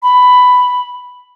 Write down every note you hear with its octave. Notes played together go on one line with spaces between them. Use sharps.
B5